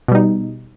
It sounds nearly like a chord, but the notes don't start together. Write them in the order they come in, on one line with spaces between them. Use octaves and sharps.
B2 G3 D#4